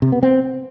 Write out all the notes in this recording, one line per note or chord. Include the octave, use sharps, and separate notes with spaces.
C3
B3
C4